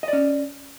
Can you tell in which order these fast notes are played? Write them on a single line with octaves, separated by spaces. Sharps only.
D#5 D5 C#4